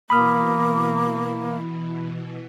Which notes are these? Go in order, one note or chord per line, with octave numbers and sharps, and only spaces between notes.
B2 E3 A#3 B5 D#6 F6